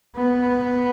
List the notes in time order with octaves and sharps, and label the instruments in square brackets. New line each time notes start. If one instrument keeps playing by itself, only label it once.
[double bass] B3